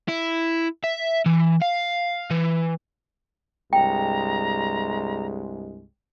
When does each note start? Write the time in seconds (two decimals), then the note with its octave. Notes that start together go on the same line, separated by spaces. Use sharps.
0.09 E4
0.84 E5
1.26 E3
1.62 F5
2.31 E3
3.73 C2 G2 G#3 G5 A#5